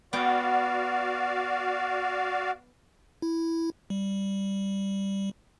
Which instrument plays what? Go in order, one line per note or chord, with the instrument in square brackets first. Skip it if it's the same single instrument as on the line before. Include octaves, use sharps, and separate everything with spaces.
[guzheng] B3 G5 [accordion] F#4 D5 F5
[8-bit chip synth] E4
G3